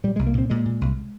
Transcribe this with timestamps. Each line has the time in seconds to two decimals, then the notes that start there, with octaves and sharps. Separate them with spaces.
0.04 A#2 G3
0.16 C2 G#3
0.27 A#3
0.34 A#2 C4
0.50 A#2 G#3
0.65 A#2
0.81 C2